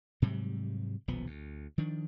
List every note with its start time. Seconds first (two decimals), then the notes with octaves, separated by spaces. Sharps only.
0.22 G#2 C3 F#3 G3
1.08 D#1 B1 F3 B3
1.27 D2
1.78 D#3 F3 D4